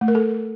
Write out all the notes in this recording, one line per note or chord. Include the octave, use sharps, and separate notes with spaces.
A3
A#4
A4